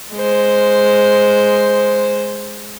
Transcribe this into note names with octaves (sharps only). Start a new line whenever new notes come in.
G#3 C5